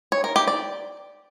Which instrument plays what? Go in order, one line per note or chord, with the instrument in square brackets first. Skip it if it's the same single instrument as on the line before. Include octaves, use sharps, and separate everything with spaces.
[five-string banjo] C#5
A#4
G4
D5